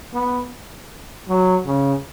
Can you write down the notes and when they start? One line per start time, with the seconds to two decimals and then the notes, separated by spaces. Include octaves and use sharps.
0.14 B3
1.28 F#3
1.66 C#3